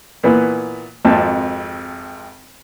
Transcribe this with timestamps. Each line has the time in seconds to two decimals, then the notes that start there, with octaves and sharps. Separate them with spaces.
0.23 A#2 E3 B3
1.05 G#1 F2 A5